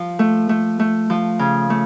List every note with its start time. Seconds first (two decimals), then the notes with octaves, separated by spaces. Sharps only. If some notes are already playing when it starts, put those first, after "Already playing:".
Already playing: F3
0.19 A3
0.49 A3
0.79 A3
1.10 F3
1.39 C#3
1.70 A3